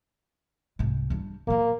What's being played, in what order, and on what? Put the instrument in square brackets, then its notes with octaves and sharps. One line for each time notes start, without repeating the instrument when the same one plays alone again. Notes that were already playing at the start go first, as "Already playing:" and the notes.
[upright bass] C2 G#2
G3 D4
[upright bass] A#2 F3 [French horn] A#3